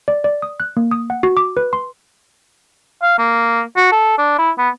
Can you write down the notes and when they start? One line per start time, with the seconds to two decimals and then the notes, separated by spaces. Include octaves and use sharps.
0.08 D5
0.24 D5
0.42 D#6
0.60 F#6
0.77 A#3
0.91 D#6
1.10 F#5
1.23 F#4
1.37 D6
1.57 B4
1.73 C6
3.03 F5
3.19 A#3
3.76 F#4
3.92 A4
4.18 D4
4.39 E4
4.58 B3